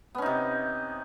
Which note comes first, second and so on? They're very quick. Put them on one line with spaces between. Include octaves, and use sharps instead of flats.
B3 C#4 D#4 C3